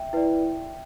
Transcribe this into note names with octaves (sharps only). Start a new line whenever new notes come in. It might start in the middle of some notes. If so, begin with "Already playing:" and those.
Already playing: E5 G5
E4 B4 D5